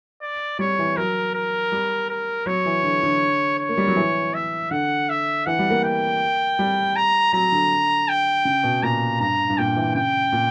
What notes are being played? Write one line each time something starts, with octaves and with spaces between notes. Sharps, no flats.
D5
G3 C#5
E3
F#3 A#4
A#4
G3
A#4
F#3 C#5
E3
D3
D3
C#5
A#3
G3
F#3
E3
E5
D3 F#5
E5
E3 F#5
G3
A#3
G5
G3
A#5
F#3 A#5
D3
G5
C#3
B2
A#2 A#5
G2 A#5
G2
A#2 G5
E3
C#3 G5
A#2